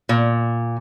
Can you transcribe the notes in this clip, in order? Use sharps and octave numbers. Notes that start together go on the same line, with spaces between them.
A#2